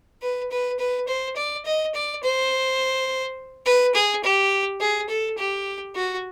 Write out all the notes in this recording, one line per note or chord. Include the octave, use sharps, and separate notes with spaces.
B4
B4
B4
C5
D5
D#5
D5
C5
B4
G#4
G4
G#4
A4
G4
F#4